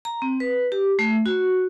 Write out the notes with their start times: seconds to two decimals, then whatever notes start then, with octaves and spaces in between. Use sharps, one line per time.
0.05 A#5
0.22 C4
0.40 B4
0.72 G4
0.99 A3
1.26 F#4